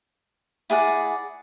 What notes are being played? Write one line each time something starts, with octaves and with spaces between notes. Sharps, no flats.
E4 G#4 D5 F#5